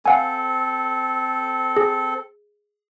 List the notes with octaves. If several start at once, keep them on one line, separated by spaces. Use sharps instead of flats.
C4 A4 F5 F#5 G#5
G#4